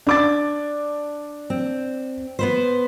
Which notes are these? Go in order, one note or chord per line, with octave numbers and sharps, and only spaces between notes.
D4 D6 A6
C4
B3 B4 C5